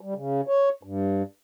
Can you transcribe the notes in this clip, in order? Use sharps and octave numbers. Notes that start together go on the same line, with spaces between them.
G3
C#3
C#5
G2